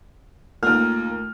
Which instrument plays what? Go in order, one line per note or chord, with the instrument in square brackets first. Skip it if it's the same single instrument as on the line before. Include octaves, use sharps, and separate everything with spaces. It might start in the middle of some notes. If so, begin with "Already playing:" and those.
[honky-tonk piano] D#2 A#3 [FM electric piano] A3 F4 [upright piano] F6